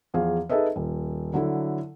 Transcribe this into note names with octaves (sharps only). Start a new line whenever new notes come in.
E2 F3 G#4 F5
D#4 G#4 A4 B4 D#5 E5
D#1
D3 F#3 E4 A4